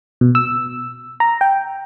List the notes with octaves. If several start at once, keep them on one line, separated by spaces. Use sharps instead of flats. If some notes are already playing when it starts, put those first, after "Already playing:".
B2
E6
A#5
G5